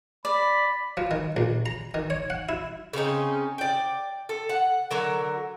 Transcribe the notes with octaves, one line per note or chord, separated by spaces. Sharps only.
D5 B5
F3
D#3
A#1
A#5
D#3
C#5
F#5
E4
C#3 C4 C#4 D#4
D5 G5
A4
F#5
D3 F#3 A#4